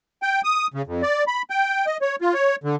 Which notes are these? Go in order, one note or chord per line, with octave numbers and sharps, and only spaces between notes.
G5
D#6
C#3
F2
D5
B5
G5
D#5
C#5
F4
C#5
D3